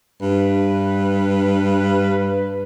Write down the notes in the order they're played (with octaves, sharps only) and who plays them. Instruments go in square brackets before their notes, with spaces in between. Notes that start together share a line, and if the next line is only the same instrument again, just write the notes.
[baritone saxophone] G2 [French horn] B4